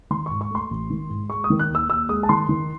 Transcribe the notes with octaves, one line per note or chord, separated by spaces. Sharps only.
D#3 C6
G#2 C#6
C#6
A3 C6
A1
D#3
G#2
G#3 C#6
D#6
D#3
F#6
D#2
E6
D#2 E6
G#3 D#6
A5
D#3 C6
D#3